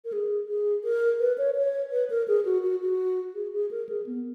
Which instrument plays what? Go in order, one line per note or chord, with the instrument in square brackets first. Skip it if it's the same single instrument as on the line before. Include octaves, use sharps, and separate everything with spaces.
[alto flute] A#4
G#4
G#4
A#4
B4
C#5
C#5
B4
A#4
G#4
F#4
F#4
F#4
G#4
G#4
A#4
G#4
B3